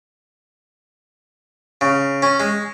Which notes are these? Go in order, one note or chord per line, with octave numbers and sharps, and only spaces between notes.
C#3
C#4
G#3